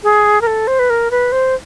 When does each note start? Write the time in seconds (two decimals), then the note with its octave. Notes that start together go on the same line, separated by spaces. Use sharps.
0.04 G#4
0.41 A#4
0.47 A4
0.67 C5
0.79 B4
0.90 A#4
1.11 B4
1.32 C5